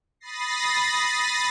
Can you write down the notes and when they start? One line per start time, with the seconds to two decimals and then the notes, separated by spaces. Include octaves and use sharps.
0.20 B5 D#6 A6 A#6 C7